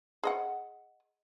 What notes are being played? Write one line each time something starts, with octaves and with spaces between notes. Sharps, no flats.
G#4 D#5 F#5